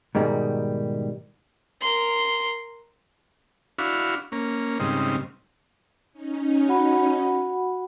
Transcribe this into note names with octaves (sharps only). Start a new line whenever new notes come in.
G#2 B2 D#3 G3
A#4 C6
D4 E4 F#4 F5 B5 C#6
A#3 C#4
G#2 C#3 G3 C4 D#4
C#4 D#4
F#4 F#5 B5